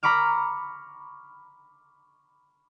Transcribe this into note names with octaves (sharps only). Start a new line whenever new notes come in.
A#5 B5 C#6 D6 F6